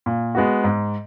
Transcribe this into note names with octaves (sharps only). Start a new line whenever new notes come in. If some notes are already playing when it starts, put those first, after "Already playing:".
A#2
G#3 B3 F#4
G#2